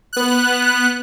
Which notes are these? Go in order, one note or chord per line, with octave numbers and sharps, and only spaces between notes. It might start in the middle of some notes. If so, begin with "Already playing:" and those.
B3 F#6